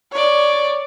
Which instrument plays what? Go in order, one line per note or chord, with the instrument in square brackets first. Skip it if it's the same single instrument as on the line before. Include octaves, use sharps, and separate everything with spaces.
[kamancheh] C#5 D5